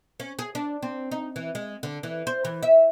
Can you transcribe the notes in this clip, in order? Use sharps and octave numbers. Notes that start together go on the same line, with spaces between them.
C#4
G#4
D4
C4
D#4
E3
G#3
D3
E3
C5
E3
E5